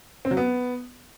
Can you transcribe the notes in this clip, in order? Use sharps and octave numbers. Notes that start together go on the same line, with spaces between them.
C4
F#3
B3